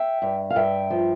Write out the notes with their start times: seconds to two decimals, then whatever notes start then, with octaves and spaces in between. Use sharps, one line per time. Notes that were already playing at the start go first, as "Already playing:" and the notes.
Already playing: E5 G5
0.22 G2
0.50 F5
0.56 G2 E5 G5
0.90 F3